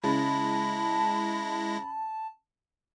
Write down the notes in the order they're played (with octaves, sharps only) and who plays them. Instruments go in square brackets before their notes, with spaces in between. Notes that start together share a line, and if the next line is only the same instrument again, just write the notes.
[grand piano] C#3 [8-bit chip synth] G#3 E4 A#6 [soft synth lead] A5 [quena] B5